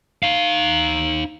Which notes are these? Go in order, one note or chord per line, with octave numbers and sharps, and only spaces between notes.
D#4 F5